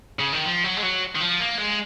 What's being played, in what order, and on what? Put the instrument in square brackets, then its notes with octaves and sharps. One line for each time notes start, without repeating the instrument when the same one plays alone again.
[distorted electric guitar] C#3
D#3
F3
F#3
G#3
F#3
D#3
F3
A#3
G#3